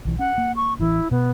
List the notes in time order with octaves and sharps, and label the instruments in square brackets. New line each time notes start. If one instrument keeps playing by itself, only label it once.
[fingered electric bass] B1 E3
[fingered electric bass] C#4 [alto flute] F#5
[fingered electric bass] A#3
[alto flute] C#6
[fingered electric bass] A1 E3 [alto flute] E4
[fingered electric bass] B2 [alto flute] B3